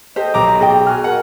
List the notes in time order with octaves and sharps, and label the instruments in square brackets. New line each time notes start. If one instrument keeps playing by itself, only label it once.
[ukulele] G4 A4 [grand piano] C5 [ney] D#5
[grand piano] B1 A#5 D6
[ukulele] G#4 D5 G5
[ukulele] F#4 G#4 [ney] G#5 [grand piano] F6
[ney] A#4 [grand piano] F#5